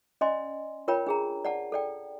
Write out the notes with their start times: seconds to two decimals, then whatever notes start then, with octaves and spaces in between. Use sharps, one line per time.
0.21 C#4 D5 D#5 G#5 C6
0.88 F4 A#4 C#5 G5 B5
1.07 D4 G#4 A#5
1.45 D5 F#5 A5
1.72 A4 D5 G5